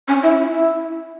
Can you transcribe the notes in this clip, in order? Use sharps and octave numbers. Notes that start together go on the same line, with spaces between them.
C#4
E4
E4
E4